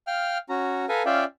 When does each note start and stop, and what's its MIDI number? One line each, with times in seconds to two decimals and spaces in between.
0.07 0.38 77
0.07 0.38 79
0.07 0.38 89
0.49 0.86 61
0.49 0.86 66
0.49 0.86 82
0.89 1.03 69
0.89 1.03 71
0.89 1.03 77
0.89 1.03 80
0.89 1.03 82
1.06 1.24 61
1.06 1.24 65
1.06 1.24 74
1.06 1.24 76
1.06 1.24 77
1.06 1.24 79